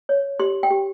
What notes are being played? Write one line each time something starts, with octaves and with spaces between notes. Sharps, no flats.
C#5
G4 C6
G5
G4